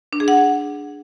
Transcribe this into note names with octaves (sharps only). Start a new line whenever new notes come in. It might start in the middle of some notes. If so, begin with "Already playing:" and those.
D4
G#4
F#5